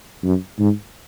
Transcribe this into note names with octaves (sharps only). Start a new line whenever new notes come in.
F#2
G#2